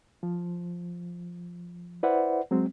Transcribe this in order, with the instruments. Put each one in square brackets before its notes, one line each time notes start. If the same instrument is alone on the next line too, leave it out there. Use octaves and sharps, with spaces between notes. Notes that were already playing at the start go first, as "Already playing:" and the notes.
[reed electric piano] F3
E4 B4 C5 D5 E5 F#5
F#3 G#3 C4